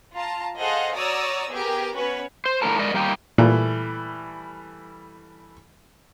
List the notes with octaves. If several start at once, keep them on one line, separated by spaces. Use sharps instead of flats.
F4 A5 A#5
G#4 A4 C5 D#5 F5 F#5
F#4 C#5 D5 A#5 D#6 E6
B3 G4 G#4 A#4
B3 C#4 F#4 B4 C#5
C5
A2 D3 B3 D4 A#4 A5
G#3 A#4 D5 D#5
G3 A#3 D#4 G5
A#2 E3 G3 A3